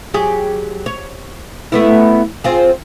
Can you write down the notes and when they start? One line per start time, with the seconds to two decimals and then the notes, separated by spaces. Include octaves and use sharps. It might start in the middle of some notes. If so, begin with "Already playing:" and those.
0.14 F#3 G4 G#4
0.86 C#5
1.72 A3 B3 E4
2.44 C4 F4 G#4